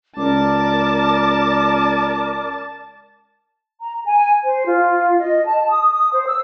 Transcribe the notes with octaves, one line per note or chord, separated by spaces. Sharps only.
C#2 A#4 D5 A5 D6
A#5
G#5
C5
F4
D#5
A5
D#6
D#6
C5
E6